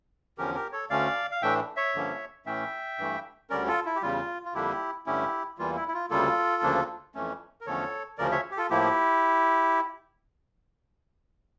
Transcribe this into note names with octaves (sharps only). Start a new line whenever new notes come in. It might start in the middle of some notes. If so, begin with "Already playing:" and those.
E2 D3 F3 C#4 G4 A#4
G4 A#4
A4 C#5
D2 D3 A3 C#4 D5 F5
F5
A2 E3 A3 D4 E5 G5
C#5 E5
G2 D3 F3 A#3 C#4
A2 E3 A3 C#4 E5 G5
G2 E3 A3
D2 D3 G3 C#4 A#4 D5
F4 A4
E4
G4
E2 C#3 G3 F4
F4
F2 D3 G3 A#3 D4 E4 G4
G2 D3 A3 C#4 E4 G4
E2 E3 G3 A#3 F4
E4
E4
F4
D2 C#3 G3 A#3 F4 A4
D2 C#3 F3 A#3 D4
F2 E3 A3 C#4
A#4
E2 D3 F3 A3 C#4 A4 C#5
D2 C#3 F3 C#4 A#4 D5
C#5 E5
G4
F4 A4
A2 F3 A#3 E4 G4